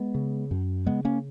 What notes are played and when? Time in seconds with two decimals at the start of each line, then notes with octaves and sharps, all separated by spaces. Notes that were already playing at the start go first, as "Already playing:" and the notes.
Already playing: G#3 B3
0.15 C#3
0.51 F#2
0.86 C#3 G#3 B3
1.05 A#3 C#4